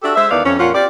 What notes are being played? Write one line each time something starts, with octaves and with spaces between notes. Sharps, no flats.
D4 F#4 G4 A4 E5
G#3 C5 E5
E2 D#3 B3 D5 F5
F2 C#4
F2 A#2 C#4 F4 F#5
C4 F4 G4 D5